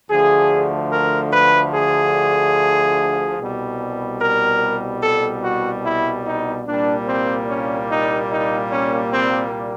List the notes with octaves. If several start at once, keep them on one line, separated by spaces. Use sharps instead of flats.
D2 D3 F3 A3 G#4
A#4
B4
G#4
C2 B2 G3
A#4
A4
F#4
E4
D#4
C2 A#2 G3 A#3 D4
C4
C#4
D#4
D#4
C#4
C4